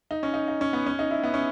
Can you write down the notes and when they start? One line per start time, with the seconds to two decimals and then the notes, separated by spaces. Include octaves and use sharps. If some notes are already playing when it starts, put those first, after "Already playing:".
0.11 D#4
0.23 C#4
0.34 D#4
0.48 D#4
0.61 C#4
0.73 B3
0.86 C#4
0.99 D#4
1.11 E4
1.23 B3
1.34 C#4